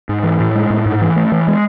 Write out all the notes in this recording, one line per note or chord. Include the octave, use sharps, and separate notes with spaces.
G#2
E3
A2
G#3
A2
G#2
E3
A3
E3
G#3